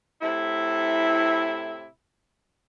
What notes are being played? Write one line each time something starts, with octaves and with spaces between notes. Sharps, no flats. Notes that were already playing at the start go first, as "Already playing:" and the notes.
A2 C3 E4